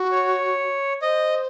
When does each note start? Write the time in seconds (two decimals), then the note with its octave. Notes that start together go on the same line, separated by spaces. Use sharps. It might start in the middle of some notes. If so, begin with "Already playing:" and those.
Already playing: F#4
0.12 C#5
1.02 C5 D#5